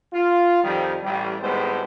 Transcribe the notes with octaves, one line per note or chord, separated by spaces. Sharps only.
F4
F2 D#3 F3 G3
A1 G3
G#1 A2 G3 G#3 B3 C5